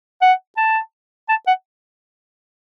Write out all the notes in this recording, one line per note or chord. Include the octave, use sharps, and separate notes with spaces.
F#5
A5
A5
F#5